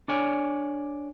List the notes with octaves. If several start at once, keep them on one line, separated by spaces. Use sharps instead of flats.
D4 A4 C#5 D5 G#5